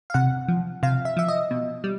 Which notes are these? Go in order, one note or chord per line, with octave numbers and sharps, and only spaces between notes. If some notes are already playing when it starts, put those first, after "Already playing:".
F5
C3 F#5
F3
C3 F5
E5
F3 E5
D#5
B2
G3